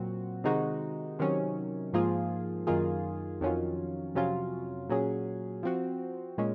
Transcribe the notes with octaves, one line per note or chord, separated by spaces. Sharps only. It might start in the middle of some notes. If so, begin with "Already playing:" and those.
Already playing: A#2 F#3 C4 F#4
C3 D#3 G#3 D#4 F#4
C3 D#3 F#3 C#4
G#2 F3 A#3 F4 G#4
F#2 D#3 A#3 F4 G#4
F2 D#3 F#3 C#4 F4
F2 C3 F#3 C#4 F4
A#2 F#3 C#4 G#4
F3 C4 F#4
A#2 G#3 C#4